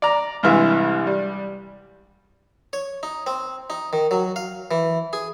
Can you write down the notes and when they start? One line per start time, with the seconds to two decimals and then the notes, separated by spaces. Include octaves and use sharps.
0.02 D5 A#5
0.43 C2 G2 E3 G#3 E5 F5
1.07 G3
2.73 C#5
3.03 D#4
3.27 C4
3.70 D#4
3.93 D#3
4.11 F#3
4.36 F5
4.71 E3
5.13 G#4